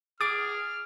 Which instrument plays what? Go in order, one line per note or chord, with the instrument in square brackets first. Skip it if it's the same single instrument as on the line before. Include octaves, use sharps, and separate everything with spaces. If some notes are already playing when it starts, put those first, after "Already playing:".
[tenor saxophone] G#4 [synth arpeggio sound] D6 [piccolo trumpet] F6 [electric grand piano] A6 D7